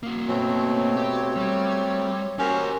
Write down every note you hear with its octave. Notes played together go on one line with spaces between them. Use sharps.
A#3 F#4
B2 F#3 A3 C4 C#5
G4
G3
C#4 F#4 G4 A#4 C5 C#5